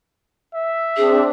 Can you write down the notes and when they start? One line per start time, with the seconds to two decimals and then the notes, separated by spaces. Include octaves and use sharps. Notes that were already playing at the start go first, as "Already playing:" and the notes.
0.54 E5
0.97 C4 D4 G#4